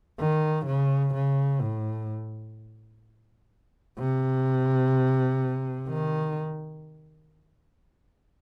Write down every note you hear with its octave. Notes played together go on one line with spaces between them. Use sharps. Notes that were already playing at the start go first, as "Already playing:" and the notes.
D#3
C#3
C#3
A2
C3
D#3